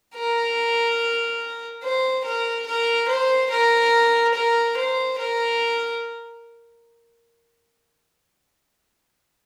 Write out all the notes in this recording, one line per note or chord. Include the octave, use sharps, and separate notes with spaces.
A#4
C5
A#4
A#4
C5
A#4
A#4
C5
A#4